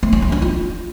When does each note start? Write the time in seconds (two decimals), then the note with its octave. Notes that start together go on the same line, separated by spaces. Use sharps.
0.03 A3
0.13 C#4
0.22 A3
0.32 D4
0.42 F4